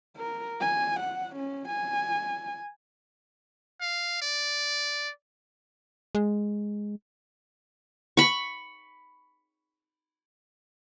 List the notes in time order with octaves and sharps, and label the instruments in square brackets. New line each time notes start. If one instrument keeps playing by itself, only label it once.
[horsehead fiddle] A#4
G#5
F#5
C#4
G#5
[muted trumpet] F5
D5
[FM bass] G#3
[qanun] B5 C#6